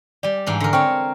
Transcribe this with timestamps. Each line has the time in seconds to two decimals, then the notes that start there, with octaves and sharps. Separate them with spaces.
0.23 G3 G4 D5
0.46 G#2 E3 D4
0.60 D3 A#4
0.73 C4 C#5 G5 C#6 F6